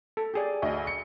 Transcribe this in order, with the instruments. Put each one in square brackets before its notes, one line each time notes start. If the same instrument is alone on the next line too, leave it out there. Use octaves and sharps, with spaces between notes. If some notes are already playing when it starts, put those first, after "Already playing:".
[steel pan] A4
G4 G#4 D5
[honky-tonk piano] D2 D#5
C#7